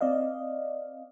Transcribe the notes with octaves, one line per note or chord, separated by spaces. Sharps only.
C4 D5 D#5 F5